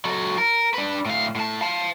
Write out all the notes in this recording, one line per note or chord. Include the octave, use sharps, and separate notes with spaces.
F#3 A4
A#4
D4 B4
A2 F5
A2 A5
F5 A5